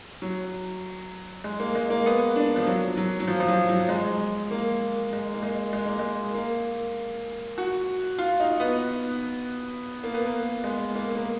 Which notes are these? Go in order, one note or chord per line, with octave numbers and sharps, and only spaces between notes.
F#3
G#3
A#3
G#3
A#3
B3
D4
F3
F#3
F#3
F#3
F3
F3
F#3
F#3
G#3
A#3
G#3
A#3
G#3
G#3
A#3
G#3
A#3
F#4
F4
D#4
B3
A#3
B3
A#3
G#3
A#3
A#3